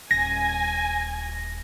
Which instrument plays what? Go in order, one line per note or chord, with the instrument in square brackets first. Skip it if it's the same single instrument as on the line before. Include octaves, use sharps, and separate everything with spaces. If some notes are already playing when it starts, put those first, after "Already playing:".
[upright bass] D#1 [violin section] G#5 [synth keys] A#6